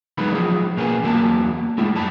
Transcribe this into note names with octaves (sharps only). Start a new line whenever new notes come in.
E2 F#3 G#3 B3 D#4 B5
F3 F#3 G#4
B2 A#3 B3 G#4
E2 B2 F#3 A#3 A5
G#3 A3 E4
F#2 G3 A5 B5